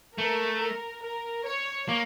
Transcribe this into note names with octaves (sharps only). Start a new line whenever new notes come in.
A3 A#4
A#4
A#4
C#5
A#3